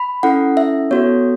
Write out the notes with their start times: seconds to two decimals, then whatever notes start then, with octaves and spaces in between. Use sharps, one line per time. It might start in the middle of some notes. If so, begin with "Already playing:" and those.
Already playing: B5
0.23 C#4 E4 A4 F#5
0.57 E5
0.91 B3 F#4 A4 C#5